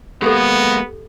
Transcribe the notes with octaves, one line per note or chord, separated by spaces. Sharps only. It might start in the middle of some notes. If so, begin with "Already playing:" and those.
G#3 A#3 B3 G4 A4